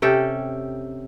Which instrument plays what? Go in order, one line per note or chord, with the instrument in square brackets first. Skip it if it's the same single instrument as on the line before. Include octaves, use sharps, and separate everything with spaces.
[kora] C3 C#4 G4 A4